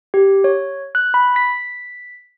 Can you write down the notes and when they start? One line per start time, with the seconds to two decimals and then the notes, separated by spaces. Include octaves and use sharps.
0.14 G4
0.44 C#5
0.95 F#6
1.14 B5
1.36 B6